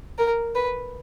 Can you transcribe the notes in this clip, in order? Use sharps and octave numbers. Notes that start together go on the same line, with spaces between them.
A#4
B4